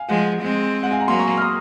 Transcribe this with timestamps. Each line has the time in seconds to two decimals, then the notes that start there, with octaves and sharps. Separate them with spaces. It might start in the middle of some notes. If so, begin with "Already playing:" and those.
Already playing: F5 G#5
0.09 F3 G#3 F#5
0.42 G#3 C4
0.83 F#5
0.91 F5 G#5
0.99 F#5 A#5
1.08 F#3 A#3 G#5 C6
1.19 A#5 C#6
1.37 F6
1.41 C6 D#6